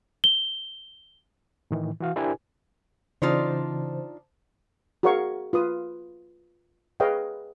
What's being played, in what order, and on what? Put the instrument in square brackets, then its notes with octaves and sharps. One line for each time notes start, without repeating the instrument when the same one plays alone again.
[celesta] G7
[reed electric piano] A2 D#3 E3
E3 F#4 F5
D4 E4 G4 A#4 C5 G#5
[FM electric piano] C#3 E3 C5 [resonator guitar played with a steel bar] D4 D#4 F4
[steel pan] F#4 G#4 A#4 C#5 F5 C#6
F4 B4 D#6
G#4 B4 C#5 D#5 F5 G5